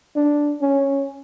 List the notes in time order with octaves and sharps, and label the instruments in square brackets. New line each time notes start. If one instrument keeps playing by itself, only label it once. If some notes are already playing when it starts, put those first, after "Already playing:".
[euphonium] D4
C#4